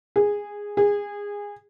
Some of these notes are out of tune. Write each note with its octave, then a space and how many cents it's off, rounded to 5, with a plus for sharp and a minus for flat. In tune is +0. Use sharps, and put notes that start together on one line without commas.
G#4 -10
G#4 -20